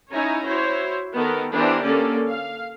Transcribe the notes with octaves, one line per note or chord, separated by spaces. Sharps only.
C#4 D#4 E4 C#5 G#5 A#5
E4 F#4 C5 C#5
D#3 B3 A4 A#4
E3 B3 D4 G4 A#4 C5
D3 A#3 C#4 A4 D5
F5